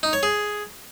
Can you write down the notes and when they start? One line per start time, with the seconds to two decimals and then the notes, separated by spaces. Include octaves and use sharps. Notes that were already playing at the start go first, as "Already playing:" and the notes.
0.03 D#4
0.13 C#5
0.23 G#4